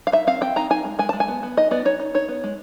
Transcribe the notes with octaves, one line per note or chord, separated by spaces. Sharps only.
F5
D#4 E5
C4 F5
C4 G5
D#4 A#5
D#4 G#5
G#3
G#3 G#5
G#3 A5
G#5
B3
B3
D#4 D#5
B3 D5
D#4 C#5
D#4
D#4 C#5
B3
G#3